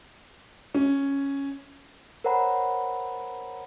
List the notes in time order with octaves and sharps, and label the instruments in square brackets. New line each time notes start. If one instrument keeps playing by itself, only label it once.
[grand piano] C#4
[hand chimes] A#4 C5 C#5 F#5 A#5 B5